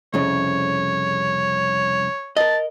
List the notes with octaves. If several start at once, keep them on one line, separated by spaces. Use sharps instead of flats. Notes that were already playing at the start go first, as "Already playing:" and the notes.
C2 F2 C#3 C#5
A#4 D#5 A5